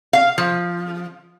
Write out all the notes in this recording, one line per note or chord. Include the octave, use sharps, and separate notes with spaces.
F5
F3